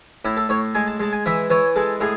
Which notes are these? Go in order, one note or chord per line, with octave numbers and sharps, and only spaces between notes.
A2 E4
A4
A2 C#5
G#3 G#5
A5
G#3 A5
G#5
E3 E5
E3 C#5
G#3 A4
A2 G#4